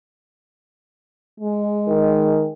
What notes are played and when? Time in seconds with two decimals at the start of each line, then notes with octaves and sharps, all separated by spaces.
1.41 G#3
1.88 D#3